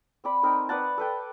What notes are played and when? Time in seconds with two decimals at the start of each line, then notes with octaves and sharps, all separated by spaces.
0.24 C4 D5 B5
0.43 C4 D#4 A#4
0.69 B4 D5 F#5 A5
0.98 A4 B4 G5